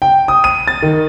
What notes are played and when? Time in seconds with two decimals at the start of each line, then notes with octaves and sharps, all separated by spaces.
0.02 G5
0.28 D#6
0.44 D#7
0.68 A6
0.83 D#3